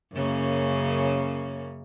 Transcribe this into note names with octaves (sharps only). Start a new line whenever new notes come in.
F#2 C#3 A#3